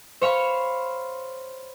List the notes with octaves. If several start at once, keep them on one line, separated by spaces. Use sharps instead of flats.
C5 C#5 F5 B5 C#6